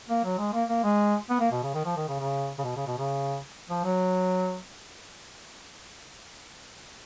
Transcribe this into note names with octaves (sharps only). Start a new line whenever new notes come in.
A#3
F#3
G#3
A#3
A#3
G#3
B3
A#3
B2
C#3
D#3
F3
D#3
C#3
C#3
C#3
B2
C#3
B2
C#3
F3
F#3